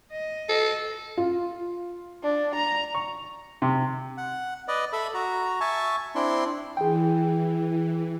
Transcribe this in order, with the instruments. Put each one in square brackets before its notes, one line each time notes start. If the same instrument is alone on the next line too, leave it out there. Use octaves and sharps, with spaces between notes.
[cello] D#5
[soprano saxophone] A4
[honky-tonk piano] F4
[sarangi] D4
A#5
[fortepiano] C#6
C3
[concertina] F#5
B4 D5 D#5
A4 E5 B5
F#4 A#5
E5 G#5 A5 C#6
C4 D4 E4 C6
[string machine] E3 [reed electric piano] G#4 G5